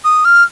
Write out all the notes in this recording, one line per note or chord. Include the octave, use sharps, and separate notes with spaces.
D#6
F6